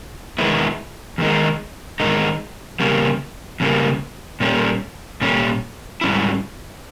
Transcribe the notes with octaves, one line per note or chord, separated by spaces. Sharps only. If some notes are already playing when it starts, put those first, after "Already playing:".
E2 D#3 G#3 B3 E4
E2 D#3 G#3 D#4
E2 D#3 G#3 D#4
E2 C#3 G3 A#3
E2 C#3 G3 A#3
A#2 G3 C#4
A#2 G3 C#4
G#2 G3 C#4 E4